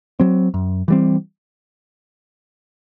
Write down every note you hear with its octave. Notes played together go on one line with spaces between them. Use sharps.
F#3 C4
F#2
E3 G3 C4